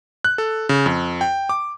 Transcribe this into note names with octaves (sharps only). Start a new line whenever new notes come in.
F#6
A4
C#3
F2
G5
D6